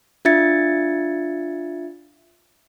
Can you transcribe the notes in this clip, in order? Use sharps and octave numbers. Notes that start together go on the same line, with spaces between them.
D4 F4 E5 G#6 A6 C#7